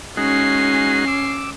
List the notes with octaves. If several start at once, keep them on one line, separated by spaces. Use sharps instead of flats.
G#3 C#4 D#4 F#4 C7
D6 E6